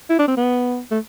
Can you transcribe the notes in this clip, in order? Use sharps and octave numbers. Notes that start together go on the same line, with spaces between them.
E4
D4
C4
B3
A3